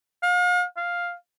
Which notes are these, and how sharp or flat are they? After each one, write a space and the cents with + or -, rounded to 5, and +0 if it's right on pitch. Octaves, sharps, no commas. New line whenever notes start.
F5 +40
F5 +5